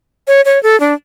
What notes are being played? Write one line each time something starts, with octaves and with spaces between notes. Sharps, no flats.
C#5
C#5
A4
D4